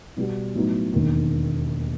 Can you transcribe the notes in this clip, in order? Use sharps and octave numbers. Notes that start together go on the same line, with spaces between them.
B2 G3 B3 F#4
A2 F#3 B3 D#4
E1 D#2 D#3